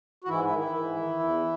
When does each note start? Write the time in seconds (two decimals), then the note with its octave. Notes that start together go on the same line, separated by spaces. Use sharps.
0.24 F#4
0.28 G#2 E3 E4
0.43 E3 E4
0.51 D#3
0.58 E3 E4
0.73 G#2
0.96 D#3
1.20 E2